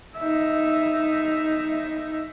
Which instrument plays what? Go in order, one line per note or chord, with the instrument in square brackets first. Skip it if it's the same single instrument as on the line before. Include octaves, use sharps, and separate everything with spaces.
[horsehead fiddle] D#4 E5